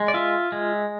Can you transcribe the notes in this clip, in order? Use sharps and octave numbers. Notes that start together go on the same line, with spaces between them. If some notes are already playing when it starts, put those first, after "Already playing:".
Already playing: G#3
D5
F4 E5
G#3